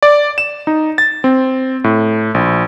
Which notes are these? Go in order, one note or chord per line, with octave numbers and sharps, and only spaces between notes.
D5
E7
D#4
A6
C4
A2
A#1